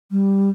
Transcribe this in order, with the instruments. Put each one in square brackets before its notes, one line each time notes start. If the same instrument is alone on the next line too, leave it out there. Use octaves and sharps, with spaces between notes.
[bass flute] G3